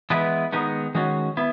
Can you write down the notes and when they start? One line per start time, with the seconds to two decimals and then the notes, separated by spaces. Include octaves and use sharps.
0.10 E3 G#3 B3 E4 B4
0.53 D#3 G#3 B3 D#4
0.95 D#3 G#3 C#4 F#4
1.37 B3 E4